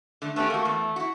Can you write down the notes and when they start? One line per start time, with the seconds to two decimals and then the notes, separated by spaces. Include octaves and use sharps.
0.22 D3 A3
0.36 A3 B3 C#4 G4
0.50 A3 A#3 F#4
0.65 E2
0.96 E4 F#4